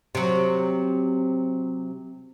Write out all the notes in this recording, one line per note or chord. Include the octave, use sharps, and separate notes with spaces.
C3 F#3